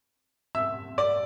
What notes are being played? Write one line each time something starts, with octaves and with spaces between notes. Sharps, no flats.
E5 E6
D5 D6